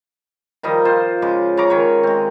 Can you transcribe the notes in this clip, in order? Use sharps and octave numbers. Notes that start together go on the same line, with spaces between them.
D#3 F3 G3 D#5
F4 C5
C#3 G#3 D6
C#3 C#4 A#5 D6
D#3 C#5
G#3 C4